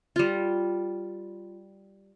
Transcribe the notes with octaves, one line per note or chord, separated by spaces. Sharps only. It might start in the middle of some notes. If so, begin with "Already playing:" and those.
G3 F4